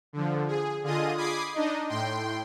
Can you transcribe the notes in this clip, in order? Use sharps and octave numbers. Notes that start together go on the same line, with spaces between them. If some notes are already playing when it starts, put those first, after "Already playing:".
D3 F3
G#4
D3 F4 G#4 D#5 D#6
B5 D6 D#6 G#6 C7
D4 D#4 D#5
A2 G5 C6